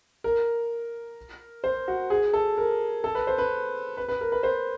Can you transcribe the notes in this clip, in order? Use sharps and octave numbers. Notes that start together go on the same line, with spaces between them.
A#4
C5
F#4
G#4
A4
A#4
A4
B4
C5
B4
B4
B4
A#4
B4
C5